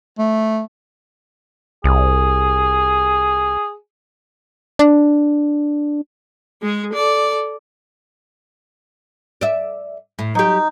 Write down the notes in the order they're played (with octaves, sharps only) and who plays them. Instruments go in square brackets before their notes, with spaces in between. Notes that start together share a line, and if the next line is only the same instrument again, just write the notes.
[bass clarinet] A3
[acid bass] C2 [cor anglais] G#4
[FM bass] D4
[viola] G#3 G#4
A4 D5
[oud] D5 E5
A2
[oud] F#3 G4 [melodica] D#4